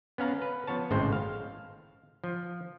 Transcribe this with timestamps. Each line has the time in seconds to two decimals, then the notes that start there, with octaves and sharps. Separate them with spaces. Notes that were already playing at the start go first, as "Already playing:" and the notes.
0.18 B3 C#4 F5 A#5
0.42 B4
0.67 F3 B3 C#5 A5
0.91 G#1 A2 C#3 G#3 C4 C5
1.12 F5
2.24 F3